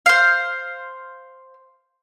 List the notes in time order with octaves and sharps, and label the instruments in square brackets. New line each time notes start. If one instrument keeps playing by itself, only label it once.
[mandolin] C5 F5